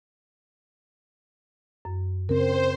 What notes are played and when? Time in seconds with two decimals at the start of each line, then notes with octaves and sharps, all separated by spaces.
1.85 F#2
2.29 C#3 C4 A#4 C5